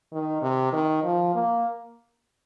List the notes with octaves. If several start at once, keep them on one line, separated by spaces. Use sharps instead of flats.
D#3
C3
D#3
F3
A#3